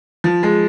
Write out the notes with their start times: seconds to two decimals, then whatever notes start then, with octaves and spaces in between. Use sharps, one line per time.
0.24 F3
0.43 G#3